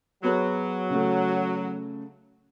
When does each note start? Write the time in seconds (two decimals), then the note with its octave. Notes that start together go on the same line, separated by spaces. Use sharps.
0.24 F#3 B3 G#4
0.90 C#3 A3